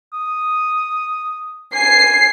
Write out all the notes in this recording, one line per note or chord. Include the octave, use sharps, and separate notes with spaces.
D#6
G#5 C7